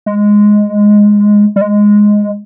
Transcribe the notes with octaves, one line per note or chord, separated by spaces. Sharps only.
G#3
G3
G#3